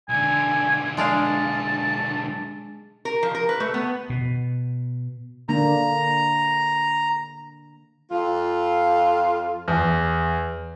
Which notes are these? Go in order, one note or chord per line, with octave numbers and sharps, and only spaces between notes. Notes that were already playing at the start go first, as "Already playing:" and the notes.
B1 D3 G#5
G#3 D4 F5 A5
A#4
F3
A#4
B4
A3
B3
B2
D3 A#3 D4 A#5
F2 F4
E2